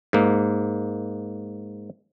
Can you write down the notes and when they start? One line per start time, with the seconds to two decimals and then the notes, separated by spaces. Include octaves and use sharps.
0.13 G#2 A#3